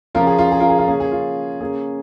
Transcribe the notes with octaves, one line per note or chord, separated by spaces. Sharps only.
C#3 F3 C#4 F4 A#4
G#4
F4
G#4
F4 A#4
G#4
F4
C#3 A#3 C#4 G#4
G#4
F4
C#3 A#3 C#4 G#4